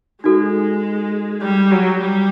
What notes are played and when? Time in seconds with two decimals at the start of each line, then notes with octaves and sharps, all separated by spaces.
0.24 G#3 D#4 F#4 A4
1.41 G3
1.71 F#3
2.01 G3